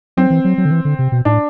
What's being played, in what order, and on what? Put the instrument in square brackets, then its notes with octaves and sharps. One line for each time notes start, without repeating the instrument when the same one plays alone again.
[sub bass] F#3 [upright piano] C4
[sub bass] E3
F#3
F#3
D3
E3
D3
C3
B2
[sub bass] A2 [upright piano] D4